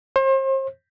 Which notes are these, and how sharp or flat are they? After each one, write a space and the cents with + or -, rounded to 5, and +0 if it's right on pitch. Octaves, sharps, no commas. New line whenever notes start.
C5 +40